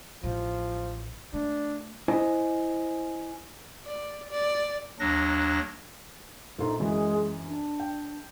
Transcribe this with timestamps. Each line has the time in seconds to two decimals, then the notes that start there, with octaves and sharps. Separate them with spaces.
0.24 A1 F3
1.33 A3 D4
2.08 E4 C5 D#5 G#5
3.86 D5
4.31 D5
4.99 D#2 F#3 D4 A#6
6.58 A#1 D#4 A4 C6
6.80 F#2 E3 G#3 F#4
7.47 D4
7.80 G5